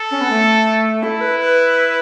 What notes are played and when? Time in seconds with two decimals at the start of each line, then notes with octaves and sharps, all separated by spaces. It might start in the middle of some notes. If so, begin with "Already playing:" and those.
Already playing: A4
0.11 C#4
0.21 B3
0.30 A3
1.03 E4 A4
1.21 B4
1.40 B4